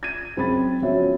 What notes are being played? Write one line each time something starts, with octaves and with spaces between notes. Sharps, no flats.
G#6 D#7
F#2 C4 G#4 B5 A6
F3 B3 C#4 F#4 C#5 E5